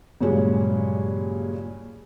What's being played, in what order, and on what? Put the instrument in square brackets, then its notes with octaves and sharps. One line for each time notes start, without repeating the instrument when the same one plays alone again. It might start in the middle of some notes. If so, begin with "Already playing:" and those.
[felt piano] G2 A#2 C#3 F#3 G#3 C#4